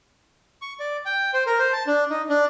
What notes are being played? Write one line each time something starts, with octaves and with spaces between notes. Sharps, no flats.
C#6
D5
G5
C5
A#4
C5
A5
D4
D#4
D4